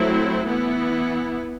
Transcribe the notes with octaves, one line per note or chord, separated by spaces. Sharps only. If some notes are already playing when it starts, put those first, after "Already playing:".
Already playing: F#3 A3 C4 E4
E3 B3 E4